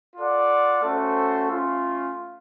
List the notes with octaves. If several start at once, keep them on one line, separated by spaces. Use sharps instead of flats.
F4 A4 D5 F#5
A3 C#4 F#4 A4 C5
A3 C#4 F4